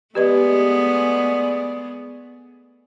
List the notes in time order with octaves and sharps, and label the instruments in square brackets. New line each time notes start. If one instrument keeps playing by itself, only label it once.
[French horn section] G#3 D5 [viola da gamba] A3 B3 G#4 [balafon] G4 B4 D#5